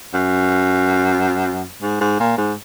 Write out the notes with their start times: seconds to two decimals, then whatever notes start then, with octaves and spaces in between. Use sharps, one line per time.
0.14 F#2
1.82 G#2
2.01 G#2
2.20 A#2
2.38 G#2